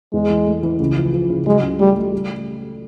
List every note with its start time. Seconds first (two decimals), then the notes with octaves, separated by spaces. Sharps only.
0.13 E2 G#3
0.30 E3
0.46 A3
0.63 E3
0.80 C#2
0.97 F3
1.13 F3
1.30 C#3
1.46 F#3 G#3
1.63 C#2
1.80 G3 A3
1.96 A3
2.12 G3